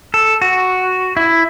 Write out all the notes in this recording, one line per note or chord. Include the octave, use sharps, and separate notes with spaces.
A4
F#4
E4